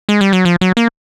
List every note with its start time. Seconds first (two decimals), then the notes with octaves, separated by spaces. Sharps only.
0.09 G#3
0.21 G3
0.33 F#3
0.45 F3
0.61 F#3
0.77 A#3